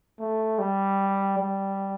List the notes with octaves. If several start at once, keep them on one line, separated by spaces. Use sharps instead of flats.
A3
G3
G3